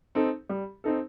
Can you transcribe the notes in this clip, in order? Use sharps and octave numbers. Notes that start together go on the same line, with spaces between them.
C4 D#4 A4
G3
C4 D#4 A4